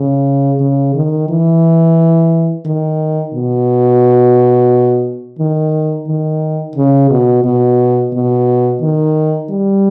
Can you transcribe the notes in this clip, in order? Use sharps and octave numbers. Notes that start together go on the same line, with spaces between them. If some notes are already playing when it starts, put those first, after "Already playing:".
Already playing: C#3
C#3
D#3
E3
D#3
B2
D#3
D#3
C#3
B2
B2
B2
D#3
G3